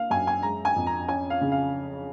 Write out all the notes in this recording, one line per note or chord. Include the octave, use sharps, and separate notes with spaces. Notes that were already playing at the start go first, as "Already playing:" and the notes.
Already playing: A#3 F5
F#2 G#5
G#5
G#3 A#5
G#5
F2
A#5
C#4 G#5
F5
C#3
F5